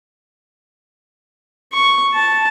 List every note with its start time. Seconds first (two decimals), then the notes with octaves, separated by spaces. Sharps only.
1.73 C#6
2.14 A5